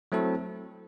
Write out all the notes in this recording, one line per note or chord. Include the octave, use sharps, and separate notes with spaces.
F#3 A3 C4 E4 A4